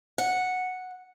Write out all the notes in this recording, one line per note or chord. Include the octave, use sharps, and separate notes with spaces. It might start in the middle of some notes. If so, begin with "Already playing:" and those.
F#5